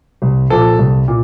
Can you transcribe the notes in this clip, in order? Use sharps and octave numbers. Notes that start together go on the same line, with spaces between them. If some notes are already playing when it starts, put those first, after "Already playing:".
C2
A#2 F3 A4
C2
A#2